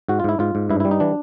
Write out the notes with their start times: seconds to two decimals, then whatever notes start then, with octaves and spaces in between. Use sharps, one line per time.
0.09 G#2 F#4
0.20 F4
0.24 G#2 E4
0.39 G#2 F4
0.55 G#2
0.70 G2 E4
0.80 E4
0.85 G3
0.91 D#4
1.00 E3 D4